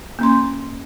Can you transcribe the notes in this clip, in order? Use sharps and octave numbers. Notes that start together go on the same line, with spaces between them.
A#3 C#4 C6